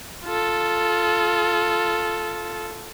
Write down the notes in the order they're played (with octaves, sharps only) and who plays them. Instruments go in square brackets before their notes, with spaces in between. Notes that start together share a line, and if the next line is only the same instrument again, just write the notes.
[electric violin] F4 A4